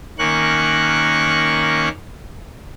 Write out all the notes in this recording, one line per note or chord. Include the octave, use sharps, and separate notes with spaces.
D#3 A#3 C#4 C#6 F#6